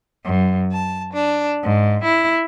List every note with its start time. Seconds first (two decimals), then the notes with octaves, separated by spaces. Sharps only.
0.24 F#2
0.71 A5
1.12 D4
1.63 G#2
2.04 E4